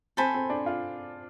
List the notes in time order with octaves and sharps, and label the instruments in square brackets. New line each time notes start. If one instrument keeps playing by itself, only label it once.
[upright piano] C4 [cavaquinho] A4 C5 G#5 B5
[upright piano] C4
D4
F4